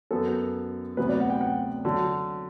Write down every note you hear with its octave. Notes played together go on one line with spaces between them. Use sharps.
F#2 F#3 B3 A4
D2 C3 F#3 B3 B4
D5
F#5
G5
F#5
D3 F#3